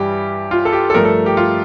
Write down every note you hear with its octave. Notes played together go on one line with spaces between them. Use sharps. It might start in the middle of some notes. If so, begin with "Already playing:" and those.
Already playing: G2 E3 G3 G4
F4
A4
G4
A4
G2 F3 A3 A#4
A4
G4
F4